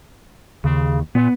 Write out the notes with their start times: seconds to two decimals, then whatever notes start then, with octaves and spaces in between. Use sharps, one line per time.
0.64 D#2 C#3
1.15 A#2 B3